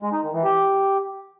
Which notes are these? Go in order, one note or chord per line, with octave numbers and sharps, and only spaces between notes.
G#3
D#4
D#3
E3
G4